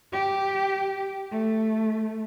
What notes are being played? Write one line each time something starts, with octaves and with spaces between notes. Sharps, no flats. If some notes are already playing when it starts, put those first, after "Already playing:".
G4
A3